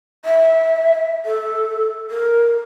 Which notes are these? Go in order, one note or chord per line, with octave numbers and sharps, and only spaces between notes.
E5
A4
A#4